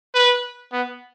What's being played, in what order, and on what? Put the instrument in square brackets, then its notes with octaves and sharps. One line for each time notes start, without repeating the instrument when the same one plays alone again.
[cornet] B4
B3